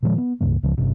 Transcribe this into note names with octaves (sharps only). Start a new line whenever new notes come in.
A#2 D#3 F3 G#3
B3
C#2 G2 C#3 A#3
C#2 C#3 F3
G1 G2 C3